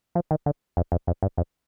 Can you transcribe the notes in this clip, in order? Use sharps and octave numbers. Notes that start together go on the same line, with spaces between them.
F3
D#3
D3
F2
F2
F2
G2
F2